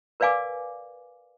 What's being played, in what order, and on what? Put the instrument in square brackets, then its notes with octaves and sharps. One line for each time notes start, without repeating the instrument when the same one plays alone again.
[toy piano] A#4 B4 D5 F5 G#5 D6